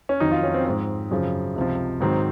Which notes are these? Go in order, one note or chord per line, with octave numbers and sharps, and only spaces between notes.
C#4
F2 D#3 F#3 D#4
F4
C#4
C4
G#2 F3 C4
F#2 C#3 F3
C#2 C3 F3
G#2 D#3 F#3 C4